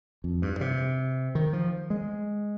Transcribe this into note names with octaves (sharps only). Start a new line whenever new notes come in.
F2
G2
C3
D#3
F3
G#3